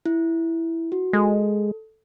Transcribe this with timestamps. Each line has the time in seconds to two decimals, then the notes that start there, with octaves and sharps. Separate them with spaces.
0.06 E4
0.92 F#4
1.13 G#3 A4